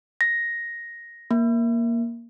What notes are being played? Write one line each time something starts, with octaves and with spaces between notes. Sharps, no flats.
A#6
A#3